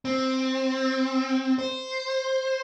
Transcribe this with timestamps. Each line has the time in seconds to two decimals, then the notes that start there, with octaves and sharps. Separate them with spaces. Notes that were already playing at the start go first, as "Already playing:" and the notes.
0.05 C4
1.59 C5